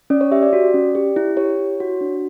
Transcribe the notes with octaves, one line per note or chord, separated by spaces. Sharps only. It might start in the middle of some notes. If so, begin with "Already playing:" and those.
C#4 D5
C#5
G4 E5
D5
F#4
C#4
G4
E4
G4 C#5
E4
F#4
D4